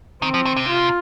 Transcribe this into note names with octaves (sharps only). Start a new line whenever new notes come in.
D#3 C4
F3
D#3
C3
F4